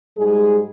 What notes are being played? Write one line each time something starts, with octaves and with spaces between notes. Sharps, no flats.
G#2 G3 G#3 G#4